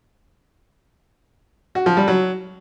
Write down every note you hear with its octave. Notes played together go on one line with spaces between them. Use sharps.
F#4
F3
G3
F#3